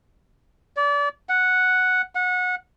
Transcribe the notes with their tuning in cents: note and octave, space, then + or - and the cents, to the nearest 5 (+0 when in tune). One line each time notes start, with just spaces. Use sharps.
D5 -30
F#5 -5
F#5 -25